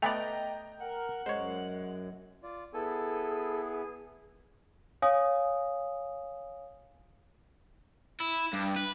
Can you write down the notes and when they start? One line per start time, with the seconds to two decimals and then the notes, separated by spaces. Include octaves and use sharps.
0.02 A3 B3 D5 D#5 G5 A#5 F7
0.81 A#4 F#5
1.26 F#2 G#3 C5 C#5
2.43 F4 D5
2.74 B3 E4 G#4 A4 G#5
5.02 C#5 F5 G#5 D#6
8.20 E4
8.53 G2
8.76 B4